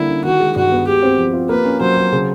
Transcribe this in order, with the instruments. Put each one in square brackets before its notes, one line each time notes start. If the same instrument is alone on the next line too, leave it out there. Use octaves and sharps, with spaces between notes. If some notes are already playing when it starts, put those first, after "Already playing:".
Already playing: [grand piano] D3 G3 A#3 [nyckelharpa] E4
[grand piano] C#4
[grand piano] D#3 [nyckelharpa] F#4
[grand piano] G#3
[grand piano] G2 [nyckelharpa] F#4
[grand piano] B3
[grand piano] G#3 [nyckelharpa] G4
[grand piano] C4
F3
F4
[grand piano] A#3 [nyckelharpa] B4
[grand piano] C#4
[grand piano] F#3 [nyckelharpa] C5
[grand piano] F#3
C#3